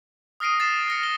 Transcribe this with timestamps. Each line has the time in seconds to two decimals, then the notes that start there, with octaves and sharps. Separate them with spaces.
0.40 D#6 F6 A#6 C7 D7 D#7
0.60 A6 C7 E7
0.88 F6 A#6 C#7
1.03 G7